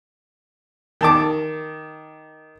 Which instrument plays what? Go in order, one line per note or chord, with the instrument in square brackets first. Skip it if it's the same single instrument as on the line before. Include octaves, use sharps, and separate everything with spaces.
[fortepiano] D#3 A5 D6